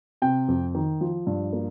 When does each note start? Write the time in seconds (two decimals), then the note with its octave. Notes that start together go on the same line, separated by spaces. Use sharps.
0.22 C3 G5
0.48 F2
0.75 D#3
1.01 F3
1.27 G2
1.53 A#3